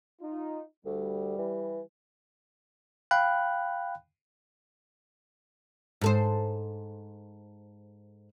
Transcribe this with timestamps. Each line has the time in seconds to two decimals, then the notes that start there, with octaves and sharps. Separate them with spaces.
0.21 D#4 F4
0.86 D2 G3
1.38 E3
3.11 F5 G5 B5 F#6
6.01 G#2 A4 C5